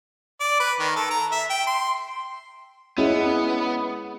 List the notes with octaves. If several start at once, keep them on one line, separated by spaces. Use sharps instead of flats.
D5
B4
D#3
A4
A#5
E5
G5
C6
G#3 B3 C#4 E4